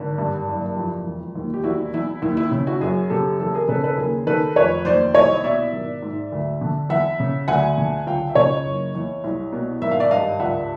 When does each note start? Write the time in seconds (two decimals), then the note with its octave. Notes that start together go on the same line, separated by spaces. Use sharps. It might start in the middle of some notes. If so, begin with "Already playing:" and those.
Already playing: G#1 D3
0.18 G2
0.48 F#1
0.76 F2
1.06 E1
1.36 D#2
1.54 G4
1.64 E1 E4 F#4
1.94 E2 E4
2.22 D#2 E4
2.37 E4
2.51 C#3
2.66 E4 F#4
2.81 F#2 F#4 G#4
3.10 C#3 G4 A4
3.40 E2 G4 A4
3.54 G#4 A#4
3.68 C#3 A4 B4
3.83 A4 B4
3.98 D#2 G#4 A#4
4.27 D#3 A4 B4
4.56 F1 B4 C#5
4.85 D#2 C5 D5
5.14 C2 C#5 D#5
5.44 B2 D5 E5
5.73 G#1
6.02 G#2
6.32 D2
6.61 D3
6.89 E2 E5 F#5
7.20 C#3
7.48 D2 F#5 G#5
7.78 D3
8.06 C#2 F5 G5
8.29 E5
8.35 C#3 C#5 D#5
8.65 F#1
8.95 E2
9.24 C2
9.53 B2
9.81 G#1 E5
9.91 F5
9.99 D5 E5
10.11 G2 D#5 F5
10.40 C#2 E5 F#5